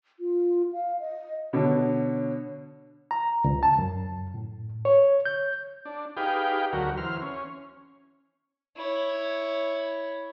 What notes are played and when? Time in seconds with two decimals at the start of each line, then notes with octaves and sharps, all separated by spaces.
0.20 F4
0.73 F5
1.00 D#5
1.53 B2 D3 C#5
3.11 A#5
3.44 C#2
3.63 A5
3.79 F#2
4.34 A2
4.85 C#5
5.25 G6
5.85 D4
6.17 D#4 G4 G#4 B4 F5 G5
6.73 D2 F#3 F#4 A#4
6.97 E3 C5 F6
7.22 C#4
8.77 E4 C#5